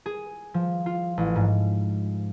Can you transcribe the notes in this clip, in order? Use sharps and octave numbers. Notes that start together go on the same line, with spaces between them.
G#4
F3
F4
A1
G#2